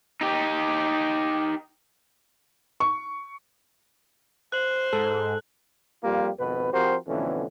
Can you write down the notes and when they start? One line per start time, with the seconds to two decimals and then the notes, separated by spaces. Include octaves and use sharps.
0.21 D#4 G4
2.80 C#6
4.52 C5 F#6 F#7
4.93 G#2 A4
6.03 F2 G3 A#3 F4 G4
6.39 G#1 F2 B2 B4
6.72 F3 C4 F#4 G4 A#4 C5
7.07 F2 B2 D3 E3 A3 C#4